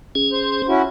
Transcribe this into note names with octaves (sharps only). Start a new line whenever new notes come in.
C#4 G#4
C5
C#4 E4 F#4